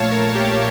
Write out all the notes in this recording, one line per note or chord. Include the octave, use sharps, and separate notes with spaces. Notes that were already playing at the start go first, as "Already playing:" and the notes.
Already playing: A#1 A#2 A3 C#5 F5 A5
A#4
G4